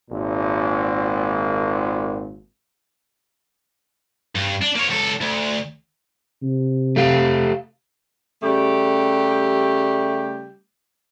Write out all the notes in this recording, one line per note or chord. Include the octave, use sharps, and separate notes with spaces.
G#1 A#2
G2
D4
A#3 C#5
C#2 A4
D2
C3
A3 G4 F5
C#3 G3 A3 G4